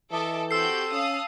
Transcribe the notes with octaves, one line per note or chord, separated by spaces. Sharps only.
E3 A4 D#5 E5 D6
C4 F#4 G4 A4 E6 G6 C7
C#4 F5 A5 D#6